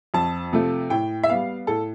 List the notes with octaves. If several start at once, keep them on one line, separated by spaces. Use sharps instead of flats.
F2 A5
C3 F3 A3
A2 G5
E5
G3 B3 F5
A2 A4